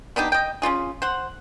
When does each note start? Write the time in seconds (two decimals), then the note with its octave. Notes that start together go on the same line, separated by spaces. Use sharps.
0.16 B3 D4 D#4 G4
0.32 D#5 G5
0.62 C#4 D#4 F4 G#4
1.02 C5 F#5